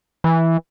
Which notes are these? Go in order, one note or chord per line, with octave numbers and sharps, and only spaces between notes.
E3